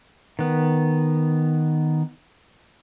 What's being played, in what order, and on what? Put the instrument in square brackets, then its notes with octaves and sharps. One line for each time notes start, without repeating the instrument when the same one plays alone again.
[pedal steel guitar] D#3 B3